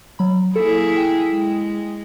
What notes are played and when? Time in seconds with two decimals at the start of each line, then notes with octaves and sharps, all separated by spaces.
0.19 F#3 B5
0.56 A#3 E4 G#4 A4
0.97 G5
1.31 G#3